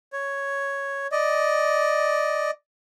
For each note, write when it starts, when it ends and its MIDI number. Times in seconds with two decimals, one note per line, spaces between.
0.13 1.07 73
1.12 2.51 74
1.12 2.51 75